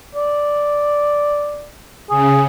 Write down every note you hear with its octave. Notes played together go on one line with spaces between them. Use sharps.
D5
C#3 G#4